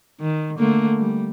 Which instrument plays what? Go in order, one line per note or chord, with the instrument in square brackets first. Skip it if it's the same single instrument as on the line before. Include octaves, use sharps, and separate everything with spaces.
[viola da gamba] D#3
D3 A3 A#3
G3